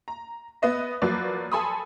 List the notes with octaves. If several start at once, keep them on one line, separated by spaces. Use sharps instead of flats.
A#5
B3 B4 D#5 E5
F3 F#3 A#3 F#4 B4 D5
A4 G#5 A5 B5 C6 D#6